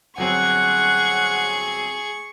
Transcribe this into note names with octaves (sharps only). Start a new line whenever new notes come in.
G1 F#3 C4 G#4 F#5 C#6